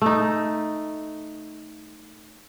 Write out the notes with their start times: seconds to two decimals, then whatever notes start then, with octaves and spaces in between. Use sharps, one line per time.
0.02 A3 D#4